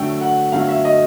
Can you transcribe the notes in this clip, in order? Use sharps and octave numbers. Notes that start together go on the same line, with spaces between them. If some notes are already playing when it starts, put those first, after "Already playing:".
Already playing: D3 F#3 A3 G5
F#5
D3 F#3 A3 F5
E5
D#5